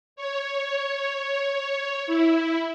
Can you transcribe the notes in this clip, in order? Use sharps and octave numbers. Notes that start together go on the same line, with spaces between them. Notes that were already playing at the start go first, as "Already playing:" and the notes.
C#5
E4